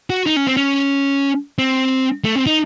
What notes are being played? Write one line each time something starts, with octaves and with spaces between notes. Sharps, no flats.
F#4
D#4
C#4
C4
C#4
C4
A3
C4
D#4